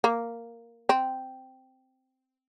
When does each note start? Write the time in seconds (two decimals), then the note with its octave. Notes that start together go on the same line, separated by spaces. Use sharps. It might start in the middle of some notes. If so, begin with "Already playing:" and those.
0.04 A#3
0.89 C4